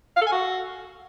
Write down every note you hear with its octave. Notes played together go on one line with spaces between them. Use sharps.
F5
A4
G#5
F#4